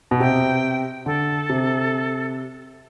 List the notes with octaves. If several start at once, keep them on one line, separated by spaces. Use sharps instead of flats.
B2
C3 G5
D3 A4
C3